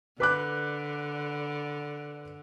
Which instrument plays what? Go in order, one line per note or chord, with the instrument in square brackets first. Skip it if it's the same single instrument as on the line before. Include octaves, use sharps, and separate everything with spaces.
[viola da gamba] D3 [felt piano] B4 D6 F#6